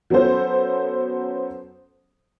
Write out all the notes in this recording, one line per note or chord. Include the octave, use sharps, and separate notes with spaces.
F#3 B3 C#4 A4 C5